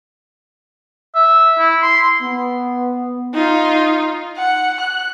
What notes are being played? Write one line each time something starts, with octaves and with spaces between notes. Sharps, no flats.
E5
E4
C6
B3
D#4 F4
F#5
F#6